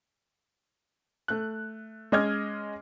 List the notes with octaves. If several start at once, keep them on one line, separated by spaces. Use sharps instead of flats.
A3 F#6
G#3 C#4 D#5 D6 F6 G#6